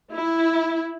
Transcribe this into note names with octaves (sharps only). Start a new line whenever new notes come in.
E4